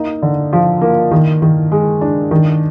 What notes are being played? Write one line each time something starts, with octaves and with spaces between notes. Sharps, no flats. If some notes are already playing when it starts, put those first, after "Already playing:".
Already playing: A#3 D#4
D3
F3
A#3
D#3
D#3
G#3
D4
D#3